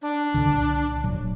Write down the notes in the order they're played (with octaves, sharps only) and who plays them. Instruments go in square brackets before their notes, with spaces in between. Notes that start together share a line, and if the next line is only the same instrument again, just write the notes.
[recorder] D4
[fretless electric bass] C2 A#2 D3
D1 A#2 F#3